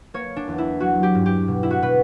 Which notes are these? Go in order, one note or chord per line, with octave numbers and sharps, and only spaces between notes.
A#3 C#5
D4
E2
E4
F#3 F#4
G4
G2
G4
B2
E4
F#4
B2 B4